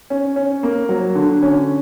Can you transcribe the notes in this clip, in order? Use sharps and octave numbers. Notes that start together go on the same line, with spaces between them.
C#4
C#4
A#3
F#3
D3
C#4